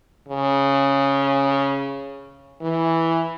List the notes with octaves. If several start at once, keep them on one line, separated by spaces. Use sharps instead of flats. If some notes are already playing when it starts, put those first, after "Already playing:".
C#3
E3